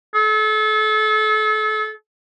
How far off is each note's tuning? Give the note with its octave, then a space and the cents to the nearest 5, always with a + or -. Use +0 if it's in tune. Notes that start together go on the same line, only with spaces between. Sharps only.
A4 -35